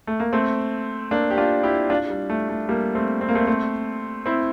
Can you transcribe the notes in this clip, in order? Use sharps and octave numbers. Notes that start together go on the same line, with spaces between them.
A3
A#3
A3 C4
A#3 D4
G4
D4 F4
E4 G4
D4 F4
G3
A3
A3
G3 A#3
A3 C4
C4
A#3
A3 C4
A3 C4
C4 E4